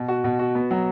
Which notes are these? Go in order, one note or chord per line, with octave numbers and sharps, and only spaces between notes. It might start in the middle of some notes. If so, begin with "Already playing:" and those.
Already playing: B2
F#4
B2
F#4
B3
F#3